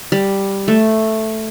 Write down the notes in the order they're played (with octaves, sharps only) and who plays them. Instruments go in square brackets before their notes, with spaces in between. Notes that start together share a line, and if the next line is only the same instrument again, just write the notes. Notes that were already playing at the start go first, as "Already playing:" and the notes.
[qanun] G3
A3